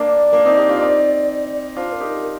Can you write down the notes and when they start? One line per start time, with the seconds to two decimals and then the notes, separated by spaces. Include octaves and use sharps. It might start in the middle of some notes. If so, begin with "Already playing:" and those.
Already playing: A#3 D4 D5
0.33 A#3 D4
0.45 C4 D#4
0.57 D#4 G4
0.69 D4 F4
0.81 C4 D#4
1.76 D4 F4 C5
1.92 A#4
2.00 D#4 G4
2.08 A#4